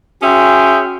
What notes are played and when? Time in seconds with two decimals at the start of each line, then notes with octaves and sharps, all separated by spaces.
0.22 C#4 F#4 G#4 E5 G5 C6